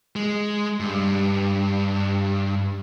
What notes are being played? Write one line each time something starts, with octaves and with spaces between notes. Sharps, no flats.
G#3
G2